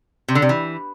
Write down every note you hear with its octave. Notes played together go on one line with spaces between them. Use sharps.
C3
D3
C3
E3